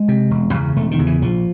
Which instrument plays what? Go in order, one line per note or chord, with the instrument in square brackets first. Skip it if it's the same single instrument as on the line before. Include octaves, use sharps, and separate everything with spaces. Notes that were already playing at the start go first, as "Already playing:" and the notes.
Already playing: [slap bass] G#3
C3
E1
E2 C#3
E1 A3
D#3
E2 C#3
E3
A#1 F3